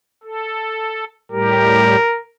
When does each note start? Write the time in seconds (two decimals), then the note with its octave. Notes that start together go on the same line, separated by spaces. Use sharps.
0.23 A4
1.32 A2 G3 G4 A#4